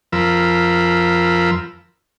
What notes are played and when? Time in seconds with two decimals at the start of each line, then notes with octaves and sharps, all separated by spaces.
0.12 F2 F3 A#4 B5 E6